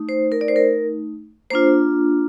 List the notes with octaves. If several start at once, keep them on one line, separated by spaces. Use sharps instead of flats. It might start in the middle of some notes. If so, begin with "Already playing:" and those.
Already playing: A3 D#4
C5
A#4
D5
C5
A#4
A#3 D4 F4 C5